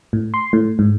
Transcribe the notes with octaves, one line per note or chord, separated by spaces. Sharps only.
A2
C6
A2
G#2